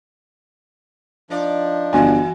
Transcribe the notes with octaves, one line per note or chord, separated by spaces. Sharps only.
F3 D4 D#4 D5
G1 E3 F#4 G#5